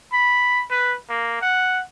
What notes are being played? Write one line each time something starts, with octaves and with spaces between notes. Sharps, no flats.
B5
B4
A#3
F#5